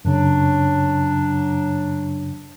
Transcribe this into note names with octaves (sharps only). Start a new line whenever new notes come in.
F#2 C#3 F#3 D4